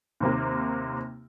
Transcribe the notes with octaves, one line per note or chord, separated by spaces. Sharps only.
D#2 C3 A#3